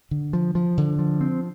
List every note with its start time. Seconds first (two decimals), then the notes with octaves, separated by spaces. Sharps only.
0.11 D3
0.33 F3
0.55 F3
0.78 D3
0.99 F3
1.21 C4